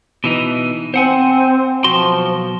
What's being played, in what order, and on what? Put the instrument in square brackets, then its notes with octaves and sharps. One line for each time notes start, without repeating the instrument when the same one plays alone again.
[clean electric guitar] B2 E3 D#4
[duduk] C4 [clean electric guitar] C5 F#5 G#5
[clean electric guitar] B1 F#4 C6 [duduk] F3